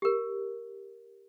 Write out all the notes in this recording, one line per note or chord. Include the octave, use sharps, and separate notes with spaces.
G4 A#4